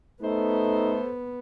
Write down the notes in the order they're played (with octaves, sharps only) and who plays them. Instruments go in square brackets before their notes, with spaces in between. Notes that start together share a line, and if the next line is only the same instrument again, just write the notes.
[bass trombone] A3 [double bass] B3 [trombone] D#4 [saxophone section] A4 C5